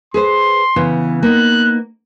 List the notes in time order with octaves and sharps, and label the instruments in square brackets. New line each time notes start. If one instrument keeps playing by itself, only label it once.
[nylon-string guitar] G#4 B4 C5 [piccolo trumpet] C6
[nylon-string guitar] C#3 E3 B3
[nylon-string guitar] A#3 B3 D#4 [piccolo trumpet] F#6